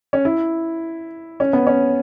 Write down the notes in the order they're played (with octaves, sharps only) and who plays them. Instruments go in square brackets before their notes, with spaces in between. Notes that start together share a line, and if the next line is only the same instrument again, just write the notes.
[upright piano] C#4
E4
C#4
B3
C#4